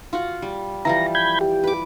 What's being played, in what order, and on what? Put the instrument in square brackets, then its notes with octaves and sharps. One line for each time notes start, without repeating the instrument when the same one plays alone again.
[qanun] F4 F#4 F#5
G3
[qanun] E3 F3 G3 [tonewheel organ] A#5
[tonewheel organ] B5 G6 G#6
G4
[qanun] B4 D6